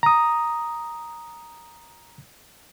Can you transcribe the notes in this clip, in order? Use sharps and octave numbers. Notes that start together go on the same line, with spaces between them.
A#5 D#6